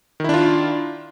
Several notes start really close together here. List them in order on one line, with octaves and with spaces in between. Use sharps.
D#3 E4 D4 F4